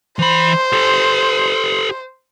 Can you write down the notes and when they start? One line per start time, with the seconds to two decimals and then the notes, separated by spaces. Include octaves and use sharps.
0.19 E3 C5 B5
0.73 G4 A4